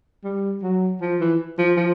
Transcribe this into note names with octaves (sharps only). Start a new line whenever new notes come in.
G3
F#3
F3
E3
F3
F3